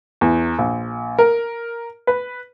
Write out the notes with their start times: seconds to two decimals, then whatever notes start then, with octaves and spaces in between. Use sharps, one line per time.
0.21 E2
0.58 A#1
1.19 A#4
2.07 B4